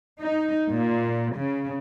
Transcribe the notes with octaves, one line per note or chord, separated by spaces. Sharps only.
D#4
A#2
C#3